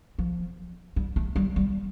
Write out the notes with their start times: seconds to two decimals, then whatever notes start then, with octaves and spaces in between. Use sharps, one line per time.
0.19 F3
0.96 G3
1.16 A3
1.36 G3
1.56 G3